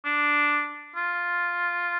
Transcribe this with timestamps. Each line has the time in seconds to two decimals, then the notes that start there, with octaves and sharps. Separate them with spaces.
0.05 D4
0.96 F4